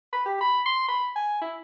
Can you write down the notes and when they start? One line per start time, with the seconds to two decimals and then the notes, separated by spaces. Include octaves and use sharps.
0.12 B5
0.26 G4
0.41 B5
0.66 C6
0.88 B5
1.16 G#5
1.41 E4